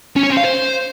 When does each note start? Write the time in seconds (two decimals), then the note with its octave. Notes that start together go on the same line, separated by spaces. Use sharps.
0.16 C#4
0.23 C#5
0.30 C4
0.37 F5
0.44 C5